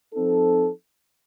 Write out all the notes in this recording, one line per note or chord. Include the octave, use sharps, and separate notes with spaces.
F3 C4 D#4 A4